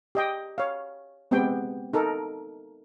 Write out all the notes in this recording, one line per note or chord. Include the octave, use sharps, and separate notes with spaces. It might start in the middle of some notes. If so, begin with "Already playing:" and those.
G4 D#5 G5
C#5 F5
G#3 B3 C4 G4 G5
D#4 A4 A#4